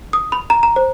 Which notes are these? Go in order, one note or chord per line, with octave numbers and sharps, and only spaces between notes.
D#6
B5
A#5
A#5
C5